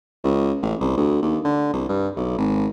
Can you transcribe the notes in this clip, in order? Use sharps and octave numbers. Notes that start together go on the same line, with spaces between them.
C#2
A1
C2
D2
D#2
D3
C2
G2
B1
G#1